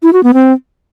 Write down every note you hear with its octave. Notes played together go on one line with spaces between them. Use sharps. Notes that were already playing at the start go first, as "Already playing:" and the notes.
E4
F#4
B3
C4